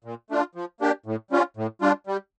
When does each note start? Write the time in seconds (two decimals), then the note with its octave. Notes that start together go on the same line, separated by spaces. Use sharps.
0.04 A#2
0.30 A3 D4 F4
0.55 F3
0.80 A#3 D4 G4
1.06 A2
1.31 G3 C#4 F4
1.57 A2
1.81 G3 D4 F4
2.07 G3